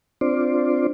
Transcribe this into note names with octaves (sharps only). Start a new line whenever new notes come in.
C4 D4 F4 C5 D5